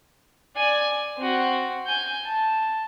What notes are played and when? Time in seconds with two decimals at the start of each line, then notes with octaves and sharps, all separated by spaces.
0.57 D5 G#5
1.18 C4 F#4
1.87 G#5 G6
2.25 A5